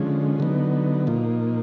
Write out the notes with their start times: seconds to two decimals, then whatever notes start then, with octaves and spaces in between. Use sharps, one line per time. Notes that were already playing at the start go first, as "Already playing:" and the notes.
Already playing: D3 F3 G#3 C#4
0.40 D3 F#3 B3 D#4
1.07 A#2 F3 A#3 D#4